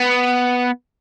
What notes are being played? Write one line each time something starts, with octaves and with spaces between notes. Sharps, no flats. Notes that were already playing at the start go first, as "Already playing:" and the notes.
Already playing: B3